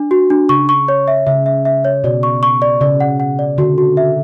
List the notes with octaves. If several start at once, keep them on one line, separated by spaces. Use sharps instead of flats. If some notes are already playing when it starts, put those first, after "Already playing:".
Already playing: D4
F#4
D4
C#3 C#6
C#6
C#5
E5
C#3 E5
E5
E5
C#5
B2 D5
C#6
C#6
D5
C#3 D5
F#5
F#5
D5
D3 F#4
F#4
E5